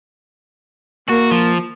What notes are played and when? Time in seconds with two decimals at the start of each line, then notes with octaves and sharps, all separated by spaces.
1.09 A#3 F#4
1.32 F3